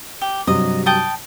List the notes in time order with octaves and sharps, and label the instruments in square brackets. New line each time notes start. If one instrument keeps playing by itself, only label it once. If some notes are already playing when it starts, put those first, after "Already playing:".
[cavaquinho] G4
[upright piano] G2 C3 F#3 [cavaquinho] D#5
[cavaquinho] G5 A5 D#6